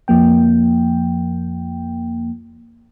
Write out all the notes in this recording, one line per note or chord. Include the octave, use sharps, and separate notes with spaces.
F2 F3 A#3 G5